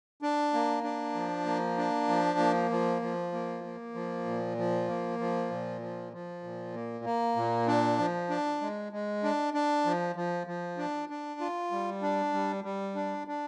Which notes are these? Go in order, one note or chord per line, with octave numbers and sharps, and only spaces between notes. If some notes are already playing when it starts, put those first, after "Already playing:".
D4
A#3
D4
F3
A#3
D4
F3
A#3
F3
F3
A#3
A#3
F3
A#2
F3
A#3
F3
A#2
F3
F3
A#2
A#3
A#3
A#2
D4
F3
D4
G#3
G#3
D4
D4
F3
F3
F3
D4
D4
F4
G3
D4
G3
G3
D4
D4